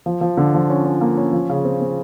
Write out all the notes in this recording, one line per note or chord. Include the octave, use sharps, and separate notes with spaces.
F3
F3
D3
F3
C#4
C#4
A#3
C#4
F3
C#3
C4
C4